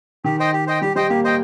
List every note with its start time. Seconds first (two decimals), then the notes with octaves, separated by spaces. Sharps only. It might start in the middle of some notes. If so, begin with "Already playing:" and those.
0.24 D#3 G4
0.40 C5 D#5 G5
0.53 G4
0.67 C5 D#5 G5
0.82 G3 G4
0.96 G3 C5 D#5 G5
1.09 A#3 G4
1.24 C5 D#5 G5